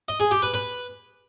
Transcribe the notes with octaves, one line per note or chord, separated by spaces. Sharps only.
D#5
G#4
G4
B4
B4